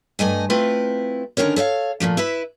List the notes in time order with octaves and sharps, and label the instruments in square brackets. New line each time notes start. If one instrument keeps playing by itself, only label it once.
[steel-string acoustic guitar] G2 A3 D#5 G#5
A3 C4 E4 F4 B4
D3 D#3 C#4 A#4 C#5
A4 C#5 D#5 F5
A#2 C#3 F3 A3
E4 B4 E5